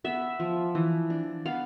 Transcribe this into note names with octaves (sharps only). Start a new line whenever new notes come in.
B3 E5
F3
E3
D4
B3 F5